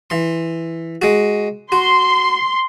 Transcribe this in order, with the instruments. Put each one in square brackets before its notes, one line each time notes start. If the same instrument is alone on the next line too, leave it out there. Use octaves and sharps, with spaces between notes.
[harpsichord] E3 C6
G#3 F#4
[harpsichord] F#4 [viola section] C6